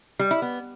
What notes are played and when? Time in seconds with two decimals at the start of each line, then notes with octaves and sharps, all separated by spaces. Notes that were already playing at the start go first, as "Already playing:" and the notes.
0.19 G3
0.31 E4
0.42 B3